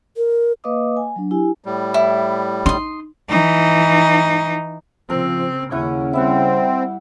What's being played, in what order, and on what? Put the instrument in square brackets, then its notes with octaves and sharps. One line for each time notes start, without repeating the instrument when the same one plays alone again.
[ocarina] A#4
[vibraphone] A#3 B4 D#5 F5 D6 D#6
G#5
F#3 D4
E4 G4 G#5
[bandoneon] A2 G3
[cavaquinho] E4
[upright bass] D#4 [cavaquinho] C6 D#6
[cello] E3 D#4
[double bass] C#3 C4 [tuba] F3 [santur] A#4
[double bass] D#2 C#4 [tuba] C#3 [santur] E4 F#5
[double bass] G3 [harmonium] C4 [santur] E4 E5 F#5